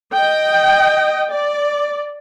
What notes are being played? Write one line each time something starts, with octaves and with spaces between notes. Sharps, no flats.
D#5 G5
D5